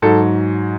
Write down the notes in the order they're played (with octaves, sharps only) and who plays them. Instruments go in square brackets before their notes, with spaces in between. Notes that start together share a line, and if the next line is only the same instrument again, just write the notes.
[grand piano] G#2 F#3 A4